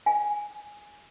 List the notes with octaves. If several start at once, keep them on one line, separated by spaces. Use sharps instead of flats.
G#5